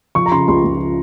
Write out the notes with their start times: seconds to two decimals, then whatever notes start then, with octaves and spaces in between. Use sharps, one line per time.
0.15 F3 C#6
0.26 A#5
0.32 C#3 C6
0.48 C#2 C6
0.64 C#2